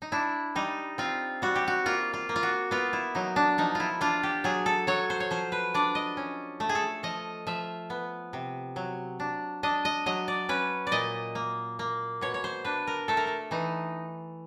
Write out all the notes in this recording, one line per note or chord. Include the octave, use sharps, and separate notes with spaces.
D#4
D4 E4
G3 D#4
C4 F4
G3 F#4
G4
F#4
A#3 F4
F4
A#3
F4
F#4
B3 F4
E4
F#3 D#4
D4
F3 D#4
E4 F4
D4 F4
G4
F#3 G#4
A4
F#3 C#5
C5
C#5
F3 C5
B4
D4 D5
D#5
C#4
A3
G#4
A4
F3 D#5
F3 E5
B3
C3
F#3
D4
D4 D#5
D#5
F#3 D#5
D5
C#4 B4
D5
A#2 D#5
A#3
A#3
B2 C#5
C#5
C5
D4 B4
A#4
A3 A4
A#4
A4
E3 D#4